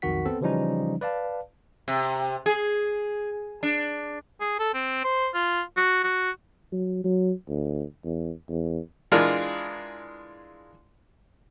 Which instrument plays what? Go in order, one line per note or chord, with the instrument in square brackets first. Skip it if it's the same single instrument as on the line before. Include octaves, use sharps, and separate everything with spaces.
[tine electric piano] B1 F2 D#3 F#4 F#5 B6
B3 C4 A4
C#3 E3 F3 G3 C#4 D#4
B4 D5 F5 A5
[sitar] C3
G#4
D4
[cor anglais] G#4
A4
C4
C5
F4
F#4
F#4
[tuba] F#3
F#3
D2
E2
E2
[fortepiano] E3 G#3 D4 F4 G#4 A#4